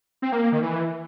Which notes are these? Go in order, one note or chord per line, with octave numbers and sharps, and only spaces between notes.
C4
A#3
A#3
D#3
E3